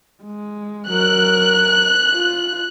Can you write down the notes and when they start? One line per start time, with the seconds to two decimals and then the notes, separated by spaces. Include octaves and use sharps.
0.23 G#3
0.90 F#3 A#4 F#6
2.13 F4